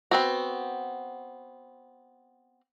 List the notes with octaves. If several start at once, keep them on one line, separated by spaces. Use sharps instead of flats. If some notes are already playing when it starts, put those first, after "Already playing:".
B3 C4 F#4